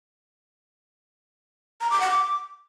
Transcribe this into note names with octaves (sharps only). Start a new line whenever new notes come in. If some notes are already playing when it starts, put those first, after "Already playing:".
A#5
D6
F#5
D6